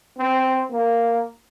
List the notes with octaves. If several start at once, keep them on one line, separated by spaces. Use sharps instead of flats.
C4
A#3